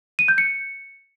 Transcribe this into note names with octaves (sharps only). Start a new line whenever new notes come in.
D#7
G6
C#7